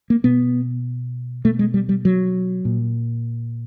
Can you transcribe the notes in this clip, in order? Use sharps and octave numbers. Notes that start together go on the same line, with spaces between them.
A#3
B2 B3
B2 A3
G#3
G3
G3
F#3
A#2